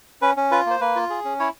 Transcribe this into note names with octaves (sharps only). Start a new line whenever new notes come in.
C#4 B4
C#4
F4 B4
A#3 C5
A#3 B4
F4
G#4
C#4
E4 C#5